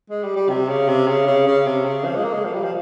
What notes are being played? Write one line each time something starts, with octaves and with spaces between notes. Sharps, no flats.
G#3
G3
G3
C3
C#3
C3
C#3
C#3
C#3
C3
C#3
F3
G#3
A#3
G#3
F3
G3
F3